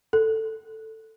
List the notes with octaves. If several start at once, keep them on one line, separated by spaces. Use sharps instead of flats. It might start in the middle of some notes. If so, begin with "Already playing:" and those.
A4